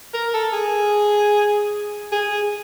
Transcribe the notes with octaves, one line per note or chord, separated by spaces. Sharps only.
A#4
A4
G#4
G#4